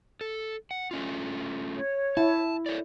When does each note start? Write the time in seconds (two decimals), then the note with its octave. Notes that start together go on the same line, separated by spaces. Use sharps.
0.21 A4
0.71 F#5
0.91 A3 C#4 F4
1.76 C#5
2.17 E4 A5
2.66 A4 C#5 D5